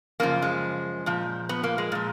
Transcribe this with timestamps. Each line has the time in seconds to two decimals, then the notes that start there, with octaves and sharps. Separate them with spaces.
0.20 F#2 C#3 F3 A#3
0.42 G#3
1.06 A#2 F3
1.49 B3
1.63 A#3
1.78 G#3
1.92 A#2 F3